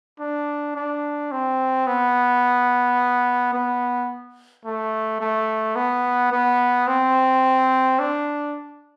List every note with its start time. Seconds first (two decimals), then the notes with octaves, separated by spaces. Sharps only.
0.20 D4
0.76 D4
1.32 C4
1.87 B3
3.54 B3
4.65 A3
5.21 A3
5.76 B3
6.32 B3
6.87 C4
7.99 D4